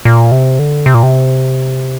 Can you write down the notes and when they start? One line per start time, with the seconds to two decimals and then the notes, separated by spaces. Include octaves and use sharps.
0.05 A#2
0.32 C3
0.59 D3
0.86 C3
0.94 A#2
1.03 C3